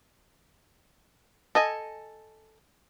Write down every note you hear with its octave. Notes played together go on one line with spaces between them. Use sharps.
A4 D#5 G#5